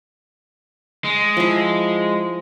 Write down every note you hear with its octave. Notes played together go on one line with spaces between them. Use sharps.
G#3
F3 E4